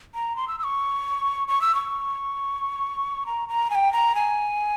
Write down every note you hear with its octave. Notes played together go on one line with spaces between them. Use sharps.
A#5
C6
E6
E6
C#6
C#6
E6
C#6
A#5
A#5
G#5
G5
A#5
G#5